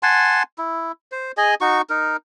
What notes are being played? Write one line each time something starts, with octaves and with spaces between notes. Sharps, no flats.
F#5 G#5 A5 C6
E4
C5
G#4 D#5 G#5
D#4 F#4 C#6
D#4 A#4